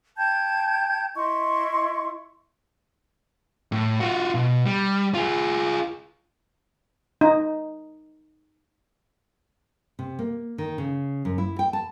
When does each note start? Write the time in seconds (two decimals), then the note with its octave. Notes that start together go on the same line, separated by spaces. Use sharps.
0.17 G5 A5 G6 G#6
1.15 E4 D#5 C6 C#6
3.72 A2
4.00 F4 F#4
4.35 B2
4.66 G3
5.14 F4 G#4
7.21 D#4
9.99 C3
10.19 A#3
10.58 D#3
10.78 C#3
11.25 F#2
11.38 E4
11.59 G5
11.73 A5